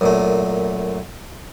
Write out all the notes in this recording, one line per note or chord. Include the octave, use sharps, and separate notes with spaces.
F#2 A#2 A3